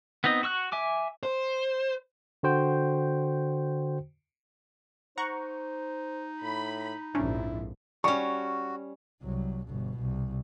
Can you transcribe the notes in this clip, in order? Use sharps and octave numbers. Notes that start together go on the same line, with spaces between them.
B3 C4 D#4 D#5
F#4 C#6 E6 F#6
E5 G#5 D6
C5
D3 F#4 C5 G5
D#4 C5 F#5 A#5 C#6
A2 B5
A#1 F2 G#2 C3 C#4 D4 E4
G3 C#4 F#4 C#6
C2 F#3
G1 B2
C2